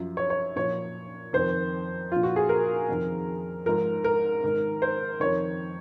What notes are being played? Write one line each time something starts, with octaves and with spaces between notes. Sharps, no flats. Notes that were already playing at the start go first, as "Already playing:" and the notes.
Already playing: F#2 F3
C#5
C#5
A#2 F3 C#5
F2 D#3 C5
A#2 F3 F4
F#4
G#4
A#4
F2 D#3
G#2 F3 A#4
A#4
G#2 D#3
C5
F2 D#3 C#5